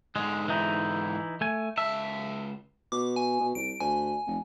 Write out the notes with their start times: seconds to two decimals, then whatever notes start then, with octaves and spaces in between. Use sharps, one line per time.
0.16 G#2 D3 G#3
0.48 E3 D#4 E4
1.41 A3 G#5
1.78 C#2 E5 A5
2.92 B2 D6
3.16 G#5
3.40 B2
3.55 C2 D7
3.80 D2 G#5
4.27 F1